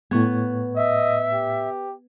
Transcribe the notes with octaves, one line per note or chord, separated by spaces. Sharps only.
A2 B3 C#6 G#6
D#5 E5
G4